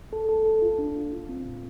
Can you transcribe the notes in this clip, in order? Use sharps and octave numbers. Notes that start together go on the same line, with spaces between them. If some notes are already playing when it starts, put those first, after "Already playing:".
A4
A4
A4
F4
D4
F4
F4
C4
A#2